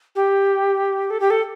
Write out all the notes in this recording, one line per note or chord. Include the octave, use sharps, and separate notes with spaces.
G4
A4
G4
A4